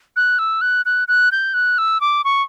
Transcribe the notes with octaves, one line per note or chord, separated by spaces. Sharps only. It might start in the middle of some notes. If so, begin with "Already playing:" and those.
F#6
E6
F#6
F#6
F#6
G6
F#6
E6
D6
C#6